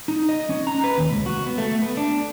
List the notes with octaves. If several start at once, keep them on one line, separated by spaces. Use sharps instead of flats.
D#4
D#5
C#4
A#5
B4
D#2
C#2
F#4
B3
A3
B3
D4